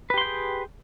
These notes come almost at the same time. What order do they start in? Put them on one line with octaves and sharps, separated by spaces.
B4 G4 C6 G5 G#4